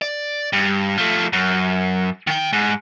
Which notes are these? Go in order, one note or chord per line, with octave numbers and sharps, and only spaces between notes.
D5
G2
F3 A3
F#2
D#3 G5
G#2